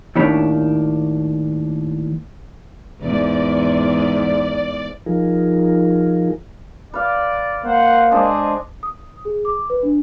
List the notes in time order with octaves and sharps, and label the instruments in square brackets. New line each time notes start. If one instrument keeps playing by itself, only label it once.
[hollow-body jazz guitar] D#2 A2 D#3 D4 C#5 B5
[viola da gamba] E2 G#2 [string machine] D5
[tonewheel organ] F3 D#4 F4 G#4 A#4
[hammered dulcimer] B4 F5 [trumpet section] D5
[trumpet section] G#3 C5 F#5 [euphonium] A#3
[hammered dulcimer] G#3 D4 C5 [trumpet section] G#4 D5 D#5
[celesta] D#6
G#4
D6
B4
D4